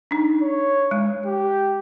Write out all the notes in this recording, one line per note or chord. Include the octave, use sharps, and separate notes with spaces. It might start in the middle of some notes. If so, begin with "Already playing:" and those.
D4 D#4
C#5
G#3
G4